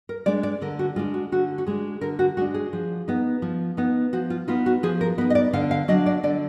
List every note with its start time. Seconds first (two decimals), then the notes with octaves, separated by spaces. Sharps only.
0.09 A#4
0.26 G#3 D4 D5
0.43 D5
0.62 D3 A#4
0.79 F#4
0.96 G#3 D4 F4
1.14 F#4
1.32 D3 F#4
1.58 F#4
1.66 G#3 D4 G#4
2.01 D3 A#4
2.19 F#4
2.37 G#3 D4 F#4
2.54 G#4
2.73 F3
3.08 B3 D#4
3.42 F3
3.77 B3 D#4
4.13 F3 F#4
4.30 F4
4.48 B3 D#4 F4
4.66 F#4
4.83 F3 G#4
5.01 A#4
5.18 B3 B4
5.21 D#4
5.30 D#5
5.35 D5
5.53 D3 F5
5.71 F5
5.88 F#3 D4 D#5
6.06 D5
6.23 D3 D5